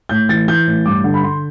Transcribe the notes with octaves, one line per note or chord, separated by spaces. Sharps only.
A2 G6
E3 A6
E3 G6
A2
G2 D6
D3
B5
D3 C6